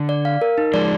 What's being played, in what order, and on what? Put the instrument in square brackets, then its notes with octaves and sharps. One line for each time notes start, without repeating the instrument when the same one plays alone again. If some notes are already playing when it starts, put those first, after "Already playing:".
Already playing: [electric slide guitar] D3
[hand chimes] D5
F5
A#4
D#4
[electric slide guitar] F3 G#3 [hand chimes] D5